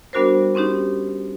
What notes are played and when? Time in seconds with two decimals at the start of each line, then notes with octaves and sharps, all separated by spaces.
0.13 G3 B3 D4 F#4 A#4 C5
0.55 C4 C#4 D#4 G4